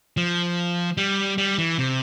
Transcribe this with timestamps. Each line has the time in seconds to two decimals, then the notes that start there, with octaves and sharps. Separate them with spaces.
0.17 F3
0.97 G3
1.38 G3
1.58 E3
1.79 C3